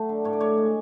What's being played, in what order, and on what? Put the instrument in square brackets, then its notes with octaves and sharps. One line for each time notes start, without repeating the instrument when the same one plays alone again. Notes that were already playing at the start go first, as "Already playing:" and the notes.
Already playing: [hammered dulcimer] F#3 A3
D3
A2 C#5
D5
A2 C#5
G#3